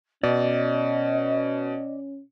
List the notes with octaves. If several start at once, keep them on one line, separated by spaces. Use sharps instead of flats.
B2 C#4 D5 D#5